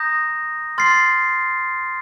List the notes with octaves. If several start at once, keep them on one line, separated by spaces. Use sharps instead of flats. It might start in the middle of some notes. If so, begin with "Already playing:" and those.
Already playing: A#5 D#6 G6 A#6
C6 F6 A6 C7